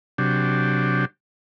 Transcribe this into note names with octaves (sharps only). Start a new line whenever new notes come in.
C3 F#3 D4 G4